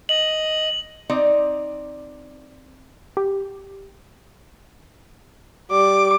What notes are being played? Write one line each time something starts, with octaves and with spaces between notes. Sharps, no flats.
D#5 F#7
C4 D#4 D5
G4
G3 D6